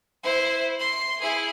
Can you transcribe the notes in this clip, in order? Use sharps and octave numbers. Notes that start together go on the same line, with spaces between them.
E4 C5
C6
E4 G#4